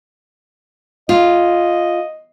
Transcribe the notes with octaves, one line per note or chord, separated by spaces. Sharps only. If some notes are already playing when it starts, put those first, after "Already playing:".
F4 D#5